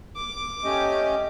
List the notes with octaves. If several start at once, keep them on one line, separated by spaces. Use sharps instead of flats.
D6
A3 C#4 G4 D#5